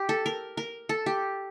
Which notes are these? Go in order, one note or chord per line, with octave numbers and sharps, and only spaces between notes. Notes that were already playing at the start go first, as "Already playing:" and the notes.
Already playing: G4
A4
A#4
A#4
A4
G4